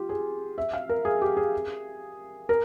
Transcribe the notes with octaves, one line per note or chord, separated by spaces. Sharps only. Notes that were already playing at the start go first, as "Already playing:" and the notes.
Already playing: F4 G4
G#4
E5
F5
A#4
G#4
G4
G#4
A#4